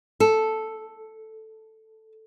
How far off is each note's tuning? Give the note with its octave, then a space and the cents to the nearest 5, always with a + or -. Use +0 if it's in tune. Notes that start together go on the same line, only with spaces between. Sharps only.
A4 +0